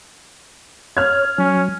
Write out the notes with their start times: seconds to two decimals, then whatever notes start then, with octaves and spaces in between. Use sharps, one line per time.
0.97 C#5 F6 G#6
1.38 F#3 C#4